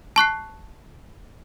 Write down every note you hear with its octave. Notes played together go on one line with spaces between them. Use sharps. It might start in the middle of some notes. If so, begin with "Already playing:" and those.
A5 C#6 F#6 C7